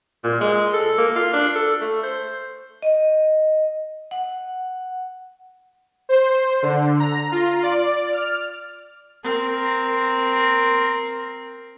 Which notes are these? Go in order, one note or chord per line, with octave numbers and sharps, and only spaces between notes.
A#2
G#3
A4
A#3
F4
D4
A4
A3
C5
D#5
F#5
C5
D3
A#5
F4
D5
F6
C4 A#4